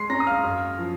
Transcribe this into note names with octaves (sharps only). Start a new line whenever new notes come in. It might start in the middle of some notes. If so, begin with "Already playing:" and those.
Already playing: G#3 C6 C7
C#4 A#5 A#6
D#6
F5 F6
F#2
F3